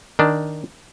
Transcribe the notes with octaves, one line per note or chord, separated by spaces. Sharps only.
D#3 D4